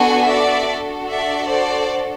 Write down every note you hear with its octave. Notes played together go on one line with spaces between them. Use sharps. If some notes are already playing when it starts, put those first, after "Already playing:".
Already playing: B3 D4 F#4 A4 F#5 G#5
D5 E5
D4 F#4 A4
D5 E5
C5 D5